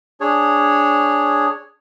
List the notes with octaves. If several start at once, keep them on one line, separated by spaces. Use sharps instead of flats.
D4 G#4 C#5